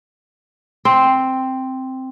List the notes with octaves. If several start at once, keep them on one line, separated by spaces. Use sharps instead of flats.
C4